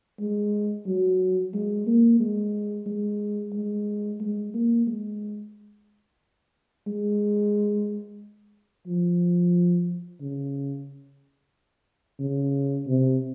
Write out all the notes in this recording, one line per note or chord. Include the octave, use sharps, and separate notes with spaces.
G#3
F#3
G#3
A#3
G#3
G#3
G#3
G#3
A#3
G#3
G#3
F3
C#3
C#3
C3